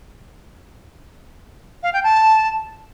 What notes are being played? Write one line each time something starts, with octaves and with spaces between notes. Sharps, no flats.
F5
G5
A5